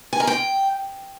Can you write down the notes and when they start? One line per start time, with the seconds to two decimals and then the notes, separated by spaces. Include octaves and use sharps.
0.13 G#5
0.20 A#4
0.27 G5